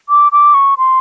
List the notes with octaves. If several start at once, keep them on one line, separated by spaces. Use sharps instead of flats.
D6
D6
C#6
C6